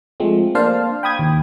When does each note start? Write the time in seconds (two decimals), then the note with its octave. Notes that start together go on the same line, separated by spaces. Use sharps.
0.20 F3 G#3 A3 C4
0.55 A#3 D4 C5 F5 A5
1.03 G5 B5 D#6 G#6
1.19 D#2